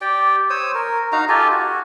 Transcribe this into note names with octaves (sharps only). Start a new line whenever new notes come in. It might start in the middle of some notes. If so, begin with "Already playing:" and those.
G4 D5 G5
C5 C#5 D#6 E6
A#4
D#4 F#4 F5 A#5
F4 G4 A4 G#5
F#4